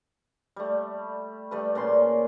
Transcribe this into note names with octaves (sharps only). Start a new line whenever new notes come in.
G3 A3
G3 A3 B4
A#2 C#3 D5 C6